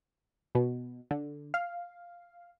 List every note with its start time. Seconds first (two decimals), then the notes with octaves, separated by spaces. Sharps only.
0.55 B2
1.11 D3
1.54 F5